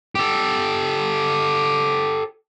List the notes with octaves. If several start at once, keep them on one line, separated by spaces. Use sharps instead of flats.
G4 A4